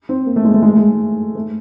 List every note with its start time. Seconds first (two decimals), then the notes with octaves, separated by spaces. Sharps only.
0.09 C4
0.27 A#3
0.36 A3
0.45 G#3
0.54 A3
0.62 G#3
0.69 A3
0.77 G#3
1.35 A3